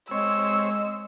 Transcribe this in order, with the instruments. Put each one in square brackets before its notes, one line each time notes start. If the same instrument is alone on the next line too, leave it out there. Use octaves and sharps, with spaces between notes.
[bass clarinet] G#3 [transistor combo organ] C4 C#5 [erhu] E6